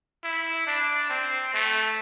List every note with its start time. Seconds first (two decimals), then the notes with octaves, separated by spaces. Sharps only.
0.24 E4
0.67 D4
1.10 C4
1.54 A3